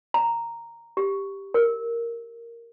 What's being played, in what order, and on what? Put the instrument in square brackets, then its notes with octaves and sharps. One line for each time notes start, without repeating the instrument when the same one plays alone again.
[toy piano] A#5
G4
A#4